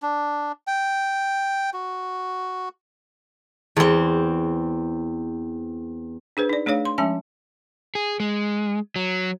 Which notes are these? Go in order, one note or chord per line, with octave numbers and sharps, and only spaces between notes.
D4
G5
F#4
E2 C4
D4 G#4 B4 C5
D#4 D5
A3 D4 G#4 C#5 F5
C6
F3 G#3 C#4 E5 G#5 B5
G#4
G#3
F#3